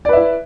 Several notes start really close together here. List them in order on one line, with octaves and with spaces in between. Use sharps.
D5 B4 E5 E4